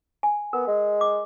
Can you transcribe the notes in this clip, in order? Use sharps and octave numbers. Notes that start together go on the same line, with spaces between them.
G#5
B3 A#4
G#3
D6